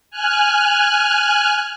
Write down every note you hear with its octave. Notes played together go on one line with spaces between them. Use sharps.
G#5 F6 F#6